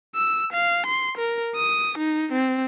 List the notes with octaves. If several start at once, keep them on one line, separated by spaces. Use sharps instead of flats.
E6
F5
C6
A#4
D#6
D#4
C4